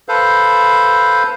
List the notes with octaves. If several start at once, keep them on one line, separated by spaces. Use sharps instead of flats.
A4 B4 C5 F5